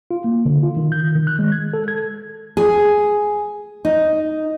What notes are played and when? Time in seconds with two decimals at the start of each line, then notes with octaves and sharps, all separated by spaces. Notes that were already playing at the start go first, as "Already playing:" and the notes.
0.11 F4
0.24 A#3
0.46 D3
0.63 F4
0.77 D#3
0.92 G6
1.15 D#3
1.27 F#6
1.39 G#3
1.52 G#6
1.74 A4
1.88 G#6
2.57 G#4
3.85 D#4